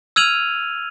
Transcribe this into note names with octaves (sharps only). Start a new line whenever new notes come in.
E6 F6 G#6 D#7 F7 F#7